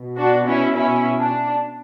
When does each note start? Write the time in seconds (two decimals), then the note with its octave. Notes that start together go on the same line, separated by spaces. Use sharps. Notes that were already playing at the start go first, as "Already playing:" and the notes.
Already playing: B2
0.17 D4 F#4
0.46 C#4 E4
0.75 C#4 E4
1.19 D4